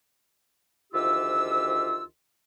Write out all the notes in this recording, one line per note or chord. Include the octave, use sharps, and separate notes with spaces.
D2 D#3 F3 F4 G4 E6